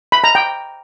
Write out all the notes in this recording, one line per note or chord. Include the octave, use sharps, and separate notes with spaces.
B5
A#5
G5